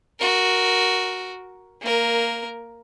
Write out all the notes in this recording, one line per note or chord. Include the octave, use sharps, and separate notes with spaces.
F#4 A#4
A#3 A#4